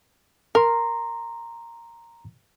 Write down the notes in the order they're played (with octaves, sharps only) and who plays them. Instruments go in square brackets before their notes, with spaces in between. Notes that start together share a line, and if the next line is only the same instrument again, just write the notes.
[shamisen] A#4 [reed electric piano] A#5 C6